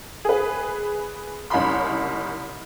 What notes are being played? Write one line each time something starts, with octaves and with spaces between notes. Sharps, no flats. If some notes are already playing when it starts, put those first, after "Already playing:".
G#4 B4
F#1 C2 D#4 C#5 B5 C6